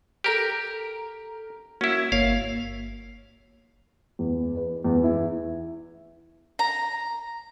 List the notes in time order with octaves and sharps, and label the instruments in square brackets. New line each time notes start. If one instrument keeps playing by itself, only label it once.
[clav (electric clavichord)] G4 A#4 [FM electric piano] A4 A#5 F6
[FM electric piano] A#3 F#4 [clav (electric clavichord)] C#4 E4
[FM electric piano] G1 A#3 C#5 [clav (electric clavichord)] F5
[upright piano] E2
B4
E2
E4
[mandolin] A#5